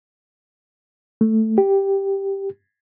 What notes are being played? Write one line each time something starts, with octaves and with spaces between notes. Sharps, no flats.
A3
G4